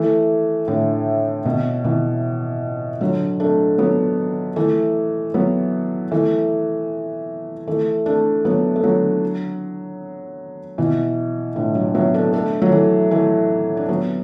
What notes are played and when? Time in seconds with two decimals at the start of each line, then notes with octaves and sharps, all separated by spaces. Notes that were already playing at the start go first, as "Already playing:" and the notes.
Already playing: E3 A3
0.68 A2 D3
1.45 B2
1.84 B2 E3
3.01 D3 F#3
3.40 A3 D4
3.78 F#3 B3
4.56 E3 A3
5.34 F#3 B3
6.12 E3 A3
7.67 E3 A3
8.06 A3 D4
8.45 F#3 B3
8.76 A3
8.84 D3 F#3
10.78 B2 E3
11.56 A2 D3
11.75 D3 F#3
11.94 F#3 B3
12.14 A3 D4
12.33 A3 D4
12.62 F#3
12.72 E3 A3
13.11 E3 A3
13.77 D4
13.89 F#3 B3